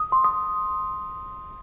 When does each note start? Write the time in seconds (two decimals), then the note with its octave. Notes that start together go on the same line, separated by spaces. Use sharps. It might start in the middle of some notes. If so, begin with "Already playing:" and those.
Already playing: D#6
0.12 C6
0.24 D#6